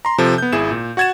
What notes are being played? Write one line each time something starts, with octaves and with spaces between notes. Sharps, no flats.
A#5 C6
C3 F3 A4
B3 G6
G#1 E4 G#4 E7
A#2
F#4 F#5 G#6 A6 E7